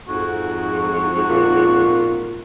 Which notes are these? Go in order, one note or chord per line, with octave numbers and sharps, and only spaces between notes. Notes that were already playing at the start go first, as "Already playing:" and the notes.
F2 G#2 F#4
A#2